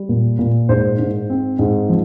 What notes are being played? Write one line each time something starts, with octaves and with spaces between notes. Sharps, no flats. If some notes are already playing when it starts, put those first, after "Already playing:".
Already playing: G3
A#2
A#2
G#2 C5
G#2
C4
G#2
F3